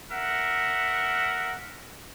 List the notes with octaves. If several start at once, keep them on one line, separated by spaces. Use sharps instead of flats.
A#4 E5 F#5